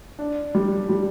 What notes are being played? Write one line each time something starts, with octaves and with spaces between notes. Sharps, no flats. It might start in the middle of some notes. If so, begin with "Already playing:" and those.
D4
G3
G3